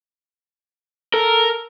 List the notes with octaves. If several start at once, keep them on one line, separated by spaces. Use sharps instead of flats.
A4 A#4